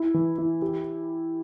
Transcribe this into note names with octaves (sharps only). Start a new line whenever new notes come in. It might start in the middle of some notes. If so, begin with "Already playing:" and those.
Already playing: E4
E3
E4
G4